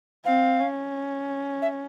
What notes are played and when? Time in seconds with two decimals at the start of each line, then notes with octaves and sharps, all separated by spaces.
0.25 C4 F5
0.59 C#4
1.62 E5